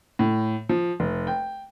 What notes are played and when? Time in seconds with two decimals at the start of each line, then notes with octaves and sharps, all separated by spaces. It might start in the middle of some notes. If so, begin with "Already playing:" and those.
0.19 A2
0.69 F3
1.00 F1
1.27 G5